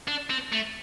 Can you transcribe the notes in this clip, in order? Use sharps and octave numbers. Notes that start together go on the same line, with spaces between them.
D4
C4
A3